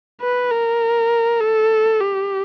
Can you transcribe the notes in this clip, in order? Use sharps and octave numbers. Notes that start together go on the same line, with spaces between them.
B4
A#4
A4
G4